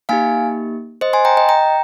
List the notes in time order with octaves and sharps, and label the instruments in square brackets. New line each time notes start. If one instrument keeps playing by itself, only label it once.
[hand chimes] A#3 D#4 G4 F5 G#5
C5 D#5
G#5 C6
G5 A#5
D#5 G5
G5 A#5